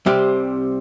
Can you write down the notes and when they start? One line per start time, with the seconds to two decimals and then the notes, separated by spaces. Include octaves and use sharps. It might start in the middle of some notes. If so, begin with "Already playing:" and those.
0.06 C2 C3 G3 C4 G4